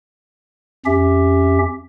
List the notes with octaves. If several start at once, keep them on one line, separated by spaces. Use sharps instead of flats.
F2 C#4 G4 E5